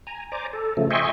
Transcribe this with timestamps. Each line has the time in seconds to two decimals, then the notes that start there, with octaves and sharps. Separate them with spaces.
0.07 G#5 A#5
0.32 C5 D5 G#5 A#5 D6
0.53 A4
0.77 C#3 F3 A3
0.90 D#5 E5 G5 G#5 C6 C#6